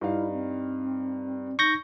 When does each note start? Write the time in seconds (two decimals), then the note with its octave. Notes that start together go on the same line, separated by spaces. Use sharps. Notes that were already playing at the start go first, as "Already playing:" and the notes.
0.01 G2 D#4 E4 F5
0.32 C4
1.59 D#4 C#6 G6 A#6